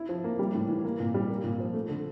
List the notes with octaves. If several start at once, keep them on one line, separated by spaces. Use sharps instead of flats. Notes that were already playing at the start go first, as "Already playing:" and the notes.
Already playing: E4
F3
A#3
G3
A2
E3
A#3
A#2
G3
A#3
A#2
F3
A3
D3